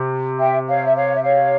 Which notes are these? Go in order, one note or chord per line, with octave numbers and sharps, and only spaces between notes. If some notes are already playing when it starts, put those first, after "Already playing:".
Already playing: C3
E5 G5
C#5 F5
E5
C#5 F5
E5
C#5 F5